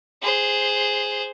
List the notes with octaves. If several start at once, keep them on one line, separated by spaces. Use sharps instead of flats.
G#4 C5